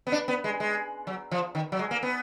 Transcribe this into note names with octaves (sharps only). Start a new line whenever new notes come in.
B3
D4
B3
G#3
G#3
F#3
F3
D#3
F#3
G#3
A#3
B3